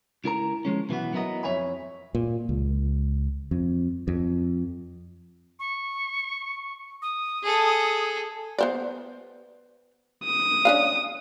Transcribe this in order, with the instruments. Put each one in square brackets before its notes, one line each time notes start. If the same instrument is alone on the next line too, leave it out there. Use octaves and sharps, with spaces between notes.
[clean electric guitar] C#2 E4 A#4 A#5
F3 G#3 C#4
B2 E3 F#3 B3
F#3 B3 E4 A#4 D#5
F2 C#5 E5 G#5 B5
[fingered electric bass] A#2
C#2
F2
F2
[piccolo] C#6
D#6
[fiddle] G#4 A4
[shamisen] B3 C5 D5
[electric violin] D#6
[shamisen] C#4 D4 F5